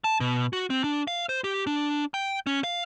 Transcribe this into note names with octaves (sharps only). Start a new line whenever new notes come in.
A5
B2
F#4
C4
D4
F5
C5
G4
D4
G5
C#4
F5